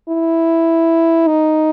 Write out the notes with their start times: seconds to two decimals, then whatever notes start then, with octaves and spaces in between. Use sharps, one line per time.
0.09 E4
1.27 D#4